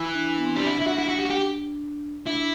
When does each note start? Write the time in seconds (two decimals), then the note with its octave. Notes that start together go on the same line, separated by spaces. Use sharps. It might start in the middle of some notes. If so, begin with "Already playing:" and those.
Already playing: E3
0.13 D4
0.36 B3
0.45 C4
0.56 G3 D4
0.67 E4
0.82 E4
0.88 F#4
0.98 E4
1.09 F#4
1.20 G4
1.25 F#4
1.30 G4
2.26 D4 E4